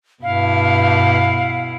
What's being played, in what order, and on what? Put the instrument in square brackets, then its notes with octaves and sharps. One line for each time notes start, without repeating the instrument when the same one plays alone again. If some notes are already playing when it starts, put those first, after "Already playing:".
[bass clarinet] G2 [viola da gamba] B2 E4 [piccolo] F5